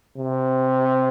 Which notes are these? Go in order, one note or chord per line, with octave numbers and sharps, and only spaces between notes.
C3